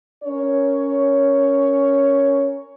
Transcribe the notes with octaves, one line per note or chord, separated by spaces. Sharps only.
C#4 A#4 C#5